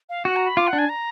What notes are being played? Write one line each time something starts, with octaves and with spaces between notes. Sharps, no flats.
F5
F#4 F#5
A#5
B5
F4 D6
F#5
D4
G#5
A#5